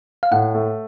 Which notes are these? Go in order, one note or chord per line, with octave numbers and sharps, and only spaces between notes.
F5
A2 F#5
A3